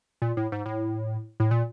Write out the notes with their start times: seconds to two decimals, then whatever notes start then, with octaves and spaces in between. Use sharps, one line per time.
0.22 A#2
0.37 A2
0.52 G#2
0.66 A2
1.40 A2
1.51 A#2